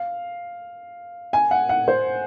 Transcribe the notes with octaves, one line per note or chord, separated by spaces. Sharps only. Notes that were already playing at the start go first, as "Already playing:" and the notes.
Already playing: F5
G#5
F#5
F#5
C5